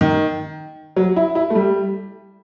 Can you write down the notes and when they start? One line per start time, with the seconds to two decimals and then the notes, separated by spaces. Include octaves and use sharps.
0.01 D#3
0.97 F#3
1.16 E4
1.35 E4
1.50 A3
1.55 G3